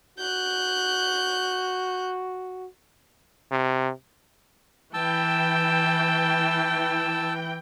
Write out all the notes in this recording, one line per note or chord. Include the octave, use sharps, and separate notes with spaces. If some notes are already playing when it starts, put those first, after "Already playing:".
F#4 F#6 G6
C3
E3 G5 A5 E6